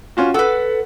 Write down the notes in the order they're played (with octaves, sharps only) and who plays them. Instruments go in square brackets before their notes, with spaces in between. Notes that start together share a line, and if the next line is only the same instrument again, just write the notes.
[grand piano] C#4 F4 F#4
[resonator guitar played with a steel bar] A4 B4 [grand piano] F#5